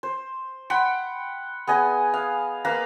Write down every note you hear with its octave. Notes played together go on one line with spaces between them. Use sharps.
C5
F#5 G5 B5 C6
B3 G#4 D#5 G#5
F5
A#3 B4 F5 A#5